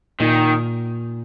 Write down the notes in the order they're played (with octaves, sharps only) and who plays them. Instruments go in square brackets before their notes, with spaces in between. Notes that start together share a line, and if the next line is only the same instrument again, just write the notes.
[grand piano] A#2 [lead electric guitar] D#3